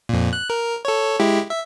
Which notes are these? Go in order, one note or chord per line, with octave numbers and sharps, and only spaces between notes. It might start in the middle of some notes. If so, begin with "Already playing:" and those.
F2 A#2
F#6
A#4
A4 C#5
G#3 E4 G4
E5